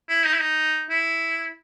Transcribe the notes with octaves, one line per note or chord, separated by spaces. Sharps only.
E4
D#4
E4
D#4
E4